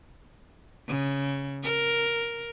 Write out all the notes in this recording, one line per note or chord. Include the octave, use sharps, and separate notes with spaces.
C#3
A#4